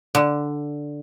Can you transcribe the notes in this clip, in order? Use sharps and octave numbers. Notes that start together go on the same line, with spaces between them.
D3